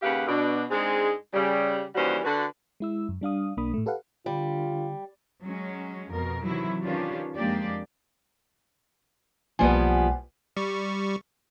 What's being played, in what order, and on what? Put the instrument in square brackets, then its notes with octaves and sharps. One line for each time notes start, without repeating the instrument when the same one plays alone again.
[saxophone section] D#2 C#3 G4 B4 F5 F#5
B2 D4
G#2 G#3 C4 D4 G#4
C#3 G3
D#2 E3 G3 C#4 F#4 C5
D3 F#4 B4
[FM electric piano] G#3 E4 E6
F#2
G3 D4 F5 D#6
B1 A#3 D4 B5 D#6
A2 A3
G4 A4 B4 F5 F#5
[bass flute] D3 [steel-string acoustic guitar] G3 [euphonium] F4
[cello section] F#3 G#3 C#4
F2 B2 A#4
C3 D#3 E3 F#3 E4
D#3 C#4 D4 F4 G4 B4
F2 G#3 A#3 D4 G4 D5
[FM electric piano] B1 A#3 G#5 [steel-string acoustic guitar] F3 G3 B3
[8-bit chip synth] G3 C#6